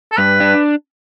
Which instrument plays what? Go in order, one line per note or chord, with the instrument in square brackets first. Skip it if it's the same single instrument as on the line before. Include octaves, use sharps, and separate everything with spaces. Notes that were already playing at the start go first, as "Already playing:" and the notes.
[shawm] A4
[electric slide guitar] G2 [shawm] B4
[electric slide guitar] D4